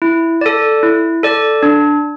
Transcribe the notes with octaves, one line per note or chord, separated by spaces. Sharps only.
E4
A4 D5
E4
A4 D5
D4